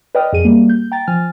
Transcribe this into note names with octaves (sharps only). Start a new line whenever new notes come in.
B4 D5 D#5 G5 D#6 F6
F2 G#4 D#7
G3 A#3
G6
G5 A#5 A6
F3 G#5 F6 A6